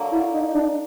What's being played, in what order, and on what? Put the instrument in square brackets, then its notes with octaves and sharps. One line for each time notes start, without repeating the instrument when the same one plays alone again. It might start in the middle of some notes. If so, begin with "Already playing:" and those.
Already playing: [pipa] D3 F#3 A#3
[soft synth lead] E4
D#4
D#4
D4